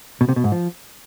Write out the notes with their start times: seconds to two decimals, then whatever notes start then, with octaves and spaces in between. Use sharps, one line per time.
0.21 B2
0.29 C3
0.36 B2
0.44 G#2
0.52 F3